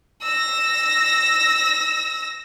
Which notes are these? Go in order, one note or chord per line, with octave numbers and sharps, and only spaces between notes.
E6 A#6